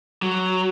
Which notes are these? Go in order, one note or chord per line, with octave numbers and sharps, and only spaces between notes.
F#3